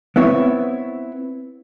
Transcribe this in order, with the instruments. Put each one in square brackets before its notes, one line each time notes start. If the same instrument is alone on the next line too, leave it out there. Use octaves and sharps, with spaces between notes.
[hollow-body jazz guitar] B3 C4 E4 C#5